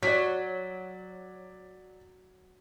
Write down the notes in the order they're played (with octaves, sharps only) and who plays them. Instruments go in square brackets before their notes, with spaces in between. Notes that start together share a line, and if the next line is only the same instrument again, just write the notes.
[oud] F#3 [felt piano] D5 B6